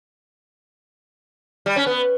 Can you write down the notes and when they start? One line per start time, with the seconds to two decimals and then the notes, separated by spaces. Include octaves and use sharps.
1.66 G3
1.76 C#4
1.86 B3